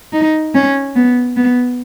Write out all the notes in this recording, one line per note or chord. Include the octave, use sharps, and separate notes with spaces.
D#4
C#4
B3
B3